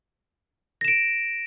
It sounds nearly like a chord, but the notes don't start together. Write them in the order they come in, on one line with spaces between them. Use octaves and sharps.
A#6 E7 D7